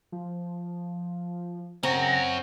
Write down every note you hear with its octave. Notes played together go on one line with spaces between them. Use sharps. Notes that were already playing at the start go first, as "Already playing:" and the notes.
F3
C#3 C4 C#4 F#4 A#5